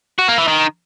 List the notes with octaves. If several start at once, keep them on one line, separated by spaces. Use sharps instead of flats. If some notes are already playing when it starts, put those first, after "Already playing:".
F#4
A#3
E3
D#3